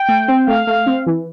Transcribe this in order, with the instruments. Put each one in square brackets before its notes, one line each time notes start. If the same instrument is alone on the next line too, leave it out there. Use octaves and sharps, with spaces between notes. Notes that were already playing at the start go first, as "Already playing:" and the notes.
Already playing: [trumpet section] G5
[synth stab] A3
C4
[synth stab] A3 [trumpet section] F5
[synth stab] A3
C4
E3